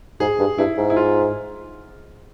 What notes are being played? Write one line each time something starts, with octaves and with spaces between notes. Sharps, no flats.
G#2 G#4
G2
G2 E4
G#2
E4
F4